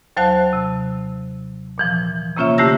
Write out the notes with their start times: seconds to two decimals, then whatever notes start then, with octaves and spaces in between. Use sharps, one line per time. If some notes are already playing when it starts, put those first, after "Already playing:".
0.17 D#2 F#3 C5 F5 A5 F#6
0.53 C3
1.78 A#2 E3 F3
2.37 C3 A#3 C#4 F4 C#5 E5
2.58 D3 A3 E4 G4 E6 A#6